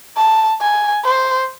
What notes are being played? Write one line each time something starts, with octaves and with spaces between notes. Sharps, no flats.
A5
G#5
C5